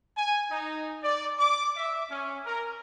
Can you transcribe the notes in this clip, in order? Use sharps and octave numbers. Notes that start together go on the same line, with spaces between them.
G#5
D#4
D5
D6
E5
C#4
A#4